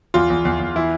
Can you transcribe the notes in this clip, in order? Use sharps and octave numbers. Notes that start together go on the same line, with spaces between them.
E2 F4
E2
E2
E2
E3 E4